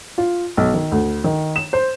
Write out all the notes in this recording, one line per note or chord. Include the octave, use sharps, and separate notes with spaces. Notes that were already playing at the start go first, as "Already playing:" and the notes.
F4
B1
D#3
D2
D#3
E7
C5